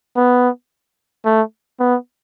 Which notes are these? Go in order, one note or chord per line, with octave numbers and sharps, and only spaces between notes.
B3
A3
B3